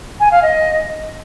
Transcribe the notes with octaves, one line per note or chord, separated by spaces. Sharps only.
G#5
F5
D#5